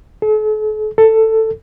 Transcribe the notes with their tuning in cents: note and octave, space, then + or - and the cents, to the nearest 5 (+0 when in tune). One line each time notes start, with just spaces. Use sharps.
A4 -45
A4 +10